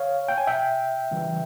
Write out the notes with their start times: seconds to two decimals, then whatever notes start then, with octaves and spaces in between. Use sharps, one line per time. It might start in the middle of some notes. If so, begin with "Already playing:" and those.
Already playing: C#5 F5
0.29 G5
0.38 G#5
0.47 E5 G5
1.11 C#3 E3 G3